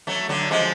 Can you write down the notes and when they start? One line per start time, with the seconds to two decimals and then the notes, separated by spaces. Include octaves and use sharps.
0.07 F#3 A3
0.29 D3 F#3
0.51 F3 G#3